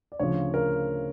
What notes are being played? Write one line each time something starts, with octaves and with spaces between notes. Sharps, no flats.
D5
D2 C#3 F3 C#5
A#4